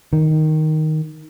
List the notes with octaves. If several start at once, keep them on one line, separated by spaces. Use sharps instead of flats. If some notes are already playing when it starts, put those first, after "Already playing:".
D#3